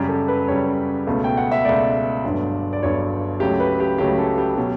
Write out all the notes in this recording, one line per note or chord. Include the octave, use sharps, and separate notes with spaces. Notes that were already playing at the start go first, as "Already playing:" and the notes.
Already playing: F#2 C#3 G3 G4
A4
B4
F#2 C#3 G3 C#5
C#2 B2 A3
G5
F#5
E5
C#2 B2 A3 D5
G1 G2 F#3
D5
G1 G2 F#3 C#5
C#2 C#3 F#3 A3 G4
B4
G4
C#2 C#3 F#3 A3 G4
A4
G4
B2 F#3